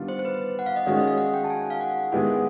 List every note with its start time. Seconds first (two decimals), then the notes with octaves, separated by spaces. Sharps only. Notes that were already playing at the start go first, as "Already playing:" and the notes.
Already playing: D#3 G3 B3 D4 F4
0.08 C5
0.19 C5
0.25 B4
0.59 F#5
0.66 F5
0.76 D#5
0.86 D#3 G#3 C#4 F#4 D5
0.97 D#5
1.07 F5
1.18 F#5
1.34 G5
1.44 A5
1.50 G#5
1.70 F5
1.81 F#5
2.12 D#3 G#3 B3 E4 G4 F#5